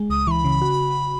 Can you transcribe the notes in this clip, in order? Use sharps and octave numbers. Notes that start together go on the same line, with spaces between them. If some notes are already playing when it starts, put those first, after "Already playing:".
Already playing: G#3
C#2 D#6
E3 B5 C#6
C#3
F#4